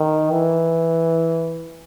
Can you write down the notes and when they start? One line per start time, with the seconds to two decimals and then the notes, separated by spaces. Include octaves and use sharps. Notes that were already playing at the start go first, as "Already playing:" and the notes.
Already playing: D#3
0.31 E3